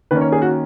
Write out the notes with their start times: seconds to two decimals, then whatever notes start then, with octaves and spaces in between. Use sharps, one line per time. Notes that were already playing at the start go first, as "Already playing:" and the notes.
0.11 D#3 A#3 C#4 B4
0.21 C#5
0.32 G#4
0.42 F#4